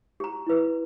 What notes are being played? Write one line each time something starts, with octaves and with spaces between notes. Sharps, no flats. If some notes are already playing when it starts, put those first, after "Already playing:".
G4 A#5
E4 B4